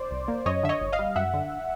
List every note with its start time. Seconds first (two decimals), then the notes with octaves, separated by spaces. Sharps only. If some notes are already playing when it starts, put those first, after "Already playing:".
Already playing: C5 D5
0.11 C2
0.28 A#3
0.46 F#2 C#5 D#5
0.63 D3 E5
0.69 C#5 D#5
0.81 G1
0.93 D#5 F5
0.99 G3
1.16 F#2 E5 F#5
1.34 D3